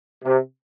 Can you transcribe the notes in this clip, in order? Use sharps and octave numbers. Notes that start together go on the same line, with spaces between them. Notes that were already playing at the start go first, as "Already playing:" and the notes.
C3